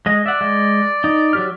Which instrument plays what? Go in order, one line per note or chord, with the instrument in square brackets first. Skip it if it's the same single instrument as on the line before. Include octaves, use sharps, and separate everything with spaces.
[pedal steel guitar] G#3 D#5
[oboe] D5 [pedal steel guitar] E5 F#5
[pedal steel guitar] G#3
D#4
F#3 G4 F6